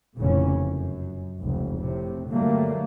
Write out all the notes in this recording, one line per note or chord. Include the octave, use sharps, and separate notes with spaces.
F1 A#2 C#3 E3 C#4
F#2
F1 C#2
A2 C3
G2 D3 F#3 G3 A3 A#3